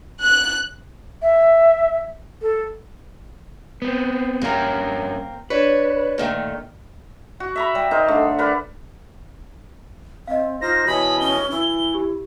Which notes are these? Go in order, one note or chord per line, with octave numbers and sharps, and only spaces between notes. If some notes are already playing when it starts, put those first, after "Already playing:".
F#6
E5
A4
B3 C4
G2 A#3 C4 C#4 A#4
D4 B4 C#5
A#2 D#3 A3
F#4
E5 A#5 B5
G3
D#4 A#4 C5
D3 A3
A#4 B4 D5 F#5
C4 D#5 F5
D#4 F4 C5 A#6
B2 E3 F#4 C#5 D#5 B5
C#4 G7
E3 E4
G4